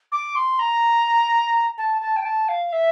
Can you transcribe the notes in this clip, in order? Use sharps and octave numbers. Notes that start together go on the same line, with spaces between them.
D6
C6
A#5
A5
A5
G5
A5
F5
E5